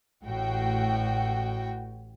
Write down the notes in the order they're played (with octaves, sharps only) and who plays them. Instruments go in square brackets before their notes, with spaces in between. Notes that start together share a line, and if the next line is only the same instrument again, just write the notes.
[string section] A1 A2 F#4 G5